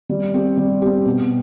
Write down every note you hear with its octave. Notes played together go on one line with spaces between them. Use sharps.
G3
C4 G4
G3
C4 G4
B2